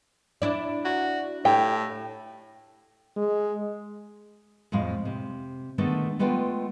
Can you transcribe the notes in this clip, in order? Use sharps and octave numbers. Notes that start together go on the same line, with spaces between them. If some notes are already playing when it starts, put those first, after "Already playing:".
D4 E4 D5
F#4
A2 G4 G5
G#3
F2 A2 G#3 F5
C3
D3 D#3 G#3 A3 B3 D4
G#3 A3 B3 F4 B4 G5